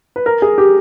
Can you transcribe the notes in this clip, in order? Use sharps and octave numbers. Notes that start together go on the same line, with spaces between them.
B4
A#4
G#4
G4